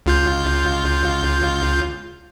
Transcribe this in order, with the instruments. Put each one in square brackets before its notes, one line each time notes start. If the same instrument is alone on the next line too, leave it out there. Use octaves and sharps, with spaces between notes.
[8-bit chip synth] C#2 F4 G6